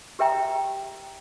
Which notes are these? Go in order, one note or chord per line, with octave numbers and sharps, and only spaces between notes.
G4 A#4 E5 G5 A#5